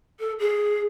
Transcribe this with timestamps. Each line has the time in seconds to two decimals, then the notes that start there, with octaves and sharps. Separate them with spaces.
0.19 A4
0.39 G#4